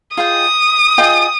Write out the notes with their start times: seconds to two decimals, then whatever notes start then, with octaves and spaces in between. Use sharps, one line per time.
0.17 F4 G#4 D#5 G5 D#6
0.98 F4 G#4 D#5 G5